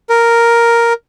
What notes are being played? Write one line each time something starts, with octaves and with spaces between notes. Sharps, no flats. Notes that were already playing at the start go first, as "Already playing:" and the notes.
A#4